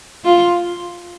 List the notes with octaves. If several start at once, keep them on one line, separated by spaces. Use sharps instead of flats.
F4